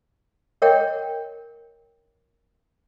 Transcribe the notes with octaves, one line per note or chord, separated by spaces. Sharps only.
A#4 C#5 D#5 F#5 G5